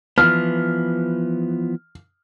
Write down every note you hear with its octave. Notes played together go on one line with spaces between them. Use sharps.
E3 F3 B3 F6